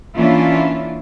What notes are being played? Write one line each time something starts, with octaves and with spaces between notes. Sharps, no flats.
E3 A#3 C#4 D4 E4 F4